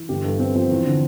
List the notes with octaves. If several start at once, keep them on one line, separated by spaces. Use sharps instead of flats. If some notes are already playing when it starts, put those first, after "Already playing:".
Already playing: E3
G1 G4
G2 A4
B3 C4 C5
F3 C4 C5
E2
D3